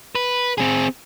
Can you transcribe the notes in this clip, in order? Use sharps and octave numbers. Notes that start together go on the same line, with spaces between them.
B4
C4 G#4